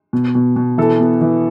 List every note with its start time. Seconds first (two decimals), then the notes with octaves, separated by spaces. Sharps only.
0.13 B2
0.35 B2
0.56 B2
0.78 E3 A4
1.00 B3
1.21 E3